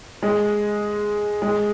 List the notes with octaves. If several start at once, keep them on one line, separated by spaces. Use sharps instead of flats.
G#3
G#3